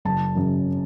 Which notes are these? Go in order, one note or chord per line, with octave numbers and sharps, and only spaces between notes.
F#1 A5
F#2 C#3